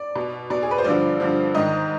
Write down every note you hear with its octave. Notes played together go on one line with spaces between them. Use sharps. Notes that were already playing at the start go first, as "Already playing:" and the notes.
Already playing: D5
B2
B2 D5
G#4
B4
C5
G2 D3 F3 D5
G2 D3 F3
G#2 D#3 D#5